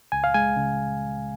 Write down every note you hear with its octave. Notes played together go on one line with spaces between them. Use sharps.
C#2 G#5
F5
G#3 G#5
C#3